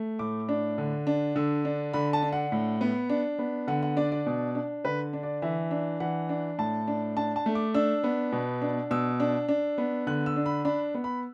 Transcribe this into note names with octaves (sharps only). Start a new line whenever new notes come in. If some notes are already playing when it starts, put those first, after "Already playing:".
Already playing: A3
A2 D6
D4
D3
D4
D3 E6
D4
D3 B5
A5
D4
F#5
A2
B3
D4
B3
D3 F#5
F#5
D4 D5
D5
B2
D4
D3 B4
D4
D5
E3 E5
D4
E3 F#5
D4
A2 A5
D4
D4 A5
A5
A3
D6
D4 E6
B3
B2
D4
B2 E6
D4
D4
B3
D3 F#6
E6
D4
B5
D4 B5
B3
B5